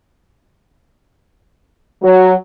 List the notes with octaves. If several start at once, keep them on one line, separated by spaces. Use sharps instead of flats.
F#3